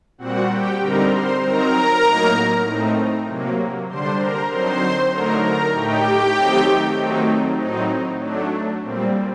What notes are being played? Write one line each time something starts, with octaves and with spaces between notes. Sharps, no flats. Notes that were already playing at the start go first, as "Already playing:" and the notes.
A#2 G3 C4 F#4 F#5
G4 G5
D3 G3 C4 D#4 A#4 A#5
C5 C6
F#3 C4 D#4 A#4 A#5
A2 F#3 A#3 D#4
A2 A3 C4 D#4
C3 F#3 A#3
D3 G3 D4 C5 C6
A#4 A#5
D3 F#3 C4 D#4 C5 C6
D3 F#3 A3 D#4 A#4 A#5
A#4 A#5
A2 A3 D#4 G4 G5
D#3 F#3 A3 C4 D#4
D#3 F#3 A3 C4 D#4
A2 F#3 C4 D#4
F#3 A3 D4
A#2 G3 C4